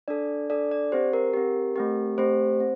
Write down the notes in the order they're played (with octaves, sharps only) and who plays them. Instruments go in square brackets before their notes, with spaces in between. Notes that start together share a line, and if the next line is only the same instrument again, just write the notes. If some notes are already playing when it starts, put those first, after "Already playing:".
[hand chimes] D4 A4 D5
D4 A4 D5
D5
C4 G4 C5
A#4
C4 G4
A3 C4 G4
A3 C4 G4 C5
C4